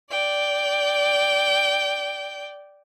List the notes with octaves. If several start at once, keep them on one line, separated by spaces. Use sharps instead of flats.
D5 G5